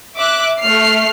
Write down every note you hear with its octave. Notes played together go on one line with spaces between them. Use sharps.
E5 D6 F#6
A3 F6 C7